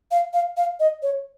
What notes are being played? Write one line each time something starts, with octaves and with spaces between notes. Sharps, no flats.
F5
F5
F5
D#5
C#5